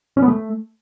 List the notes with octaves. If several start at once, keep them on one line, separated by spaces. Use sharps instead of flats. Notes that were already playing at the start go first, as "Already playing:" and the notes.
C#4
B3
A3